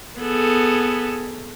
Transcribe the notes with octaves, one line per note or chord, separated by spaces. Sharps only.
B3 G#4 A4